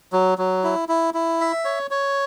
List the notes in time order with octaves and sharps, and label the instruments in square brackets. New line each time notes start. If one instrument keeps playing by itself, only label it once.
[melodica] F#3
F#3
E4
E4
E4
E5
C#5
C#5